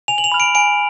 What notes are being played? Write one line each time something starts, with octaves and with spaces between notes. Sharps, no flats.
G#5 F7
F#7
F7
B5 F6
D7
G#5 D7